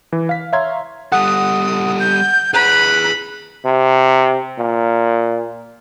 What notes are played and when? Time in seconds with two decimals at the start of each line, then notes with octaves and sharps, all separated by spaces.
0.12 E3
0.29 F5 B6
0.52 C#5 E5 F5 A#5 C6 G#6
1.12 G3 A4 F#5 D#6
2.00 G6
2.54 G#4 B4 B5 F#6
3.65 C3
4.59 A#2